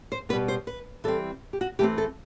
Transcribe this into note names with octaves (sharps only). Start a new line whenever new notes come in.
C5
B2 G3 B3 B4
C5
B4
E3 G3 C4 A4
G4
F#4
E3 A3 C4 G4
A4